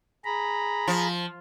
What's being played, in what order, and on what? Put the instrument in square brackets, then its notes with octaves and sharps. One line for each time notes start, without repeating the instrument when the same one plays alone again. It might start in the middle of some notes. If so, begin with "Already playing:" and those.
[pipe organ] G#4 A#5 B5
[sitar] F3